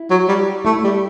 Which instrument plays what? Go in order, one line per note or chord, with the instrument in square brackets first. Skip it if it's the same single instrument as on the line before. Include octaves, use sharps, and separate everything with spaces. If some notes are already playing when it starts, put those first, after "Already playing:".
Already playing: [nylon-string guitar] E4
[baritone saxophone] F#3
G3
[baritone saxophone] A3 [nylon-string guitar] E4
[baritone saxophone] G3